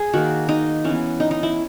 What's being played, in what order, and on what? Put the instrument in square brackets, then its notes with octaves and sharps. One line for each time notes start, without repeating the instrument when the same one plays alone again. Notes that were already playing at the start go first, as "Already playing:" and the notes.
Already playing: [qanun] G#4
D#3 A#3 F#4
D#4
E3 B3 C#4
D#4
D#4
E4